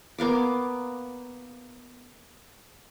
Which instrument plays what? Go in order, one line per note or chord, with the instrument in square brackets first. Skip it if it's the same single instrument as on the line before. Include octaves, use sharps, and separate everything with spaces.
[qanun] A#3 B3 F5 D6